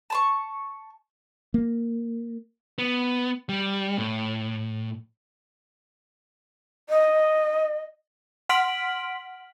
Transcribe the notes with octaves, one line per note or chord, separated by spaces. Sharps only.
A5 C6 C#6
A#3
B3
G3
A2
D#5
F#5 C6 F6 B6 D7 F#7